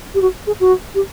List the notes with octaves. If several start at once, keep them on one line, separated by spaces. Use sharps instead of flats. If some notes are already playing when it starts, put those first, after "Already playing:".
G4
F#4
G#4
F#4
G4